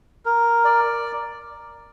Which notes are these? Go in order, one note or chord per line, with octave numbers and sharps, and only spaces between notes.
A#4
D5